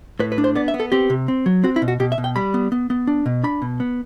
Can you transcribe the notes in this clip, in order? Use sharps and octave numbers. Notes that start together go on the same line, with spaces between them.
A2 B4
B4
D4
C5
B3 D5
E5
B3
A4
C4 G4
C3
C4
F#3
C4 F#4
E4
B2
F#4
B2 G4
E5
B2
G5
G3 B5
B3
B3
B3
D4
B2
D4 B5
B2
B3